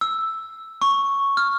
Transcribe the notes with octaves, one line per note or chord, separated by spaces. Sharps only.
E6
C#6
F6